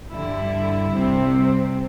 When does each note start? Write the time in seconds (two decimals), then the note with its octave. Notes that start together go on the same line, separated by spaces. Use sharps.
0.11 G2 D3 G3 E4
0.93 C2 C3 G3 C4